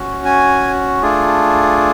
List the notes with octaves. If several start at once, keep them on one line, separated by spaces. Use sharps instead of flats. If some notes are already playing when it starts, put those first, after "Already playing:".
Already playing: C#4 F#4
G#5
A3 D4 F4 G#4